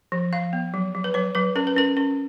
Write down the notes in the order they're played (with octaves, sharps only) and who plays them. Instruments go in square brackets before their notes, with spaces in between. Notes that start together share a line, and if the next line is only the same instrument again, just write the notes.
[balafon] F3
F3 F5
B3
F#3
F#3
B4
F#3 C#5
F#3 B4
C#4 A#4
B4
C#4 A#4
C#4